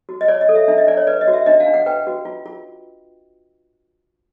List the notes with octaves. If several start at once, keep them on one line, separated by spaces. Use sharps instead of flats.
F#4
D#5
C#5 D5
D#5
A4
E5
D4 E5
D#5
D4 D5
C#5
B4 D5
D#5
F#4
E5
D4 D#5
F5
D4
F#5
B4 G5
F#4
F4
F4